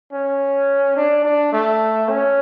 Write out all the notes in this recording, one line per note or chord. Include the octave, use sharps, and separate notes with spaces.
C#4
D4
D4
A3
C#4